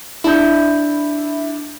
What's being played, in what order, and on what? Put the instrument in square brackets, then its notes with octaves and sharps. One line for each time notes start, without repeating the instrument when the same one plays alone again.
[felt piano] D4 G6 [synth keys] E4